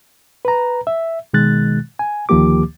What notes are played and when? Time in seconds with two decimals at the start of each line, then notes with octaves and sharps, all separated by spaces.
0.45 B4 A#5
0.87 E5
1.33 B2 D#3 G#3 F#6 A6
1.99 G#5
2.29 D2 D#3 F3 A#3 G4 D6